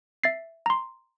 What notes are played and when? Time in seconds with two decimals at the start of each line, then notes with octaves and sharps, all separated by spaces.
0.24 E5 A6 C7
0.66 A#5 C6